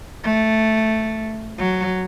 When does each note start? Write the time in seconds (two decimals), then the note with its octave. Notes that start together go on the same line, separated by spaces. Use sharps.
0.24 A3
1.58 F#3